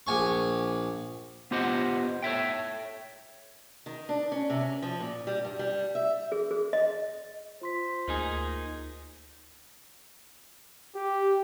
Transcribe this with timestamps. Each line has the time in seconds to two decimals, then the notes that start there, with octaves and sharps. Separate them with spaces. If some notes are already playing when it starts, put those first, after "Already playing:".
0.07 A#1 G#5 C#6
1.51 B3 F4 G4 C5 D#5 F#5
2.23 A4 C#5 E5 G5
3.86 D#3
4.09 D4
4.32 C#4
4.50 C3
4.61 C#4
4.82 F3
5.00 A#2
5.27 G3
5.45 G2
5.59 G3
5.95 E5
6.32 G#4
6.51 G#4
6.73 D#5
7.62 F4 C5 C6 B6
8.08 D2 A#3 D#4 G#4
10.95 G4